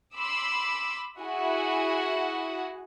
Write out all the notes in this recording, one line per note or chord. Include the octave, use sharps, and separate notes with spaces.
B5 C6 D6 E6
E4 F#4 G#4 F#5 G#5